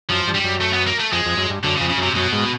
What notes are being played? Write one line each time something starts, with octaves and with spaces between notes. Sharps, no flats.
F#2 F3
G2
G3
F#2
A3
B3
A#3
A3
F2 G#3
F2
F#2
G2
F#2 D3
C#3
F2
C#3
F#2 C3
F#2 B2
G#2